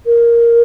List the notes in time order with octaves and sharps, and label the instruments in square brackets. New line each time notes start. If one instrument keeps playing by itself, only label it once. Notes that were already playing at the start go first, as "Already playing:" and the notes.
[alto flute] A#4